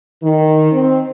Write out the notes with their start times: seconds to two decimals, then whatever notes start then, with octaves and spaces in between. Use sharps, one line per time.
0.23 D#3
0.72 C4